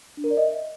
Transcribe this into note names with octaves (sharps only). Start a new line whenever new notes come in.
D4
A#4
D5
D#5
E5